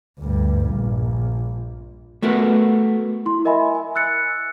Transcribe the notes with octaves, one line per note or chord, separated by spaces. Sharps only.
D2 G2
A#1
A3 B3 F#4 A#4
E4 C6
A#4 D#5 E5 G#5 B5
G#5
E6 F#6 A6 C#7